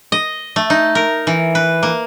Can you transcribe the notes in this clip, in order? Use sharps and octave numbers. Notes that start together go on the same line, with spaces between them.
D#5
A3
D#4
A#4
E3
B4
A#3